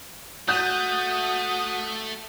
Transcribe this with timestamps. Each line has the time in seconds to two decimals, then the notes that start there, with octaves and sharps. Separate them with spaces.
0.48 A3 F#4 D#6 F#6 G6